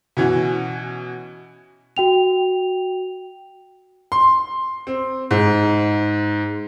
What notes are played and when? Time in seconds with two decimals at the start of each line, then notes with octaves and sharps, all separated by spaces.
0.17 B2 E3 C#4 F#4
1.97 F#4 G5 F7
4.12 C6
4.87 C4
5.31 G#2